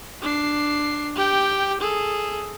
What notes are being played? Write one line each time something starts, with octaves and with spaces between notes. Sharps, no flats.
D4 C7
G4 G5
G#4 A4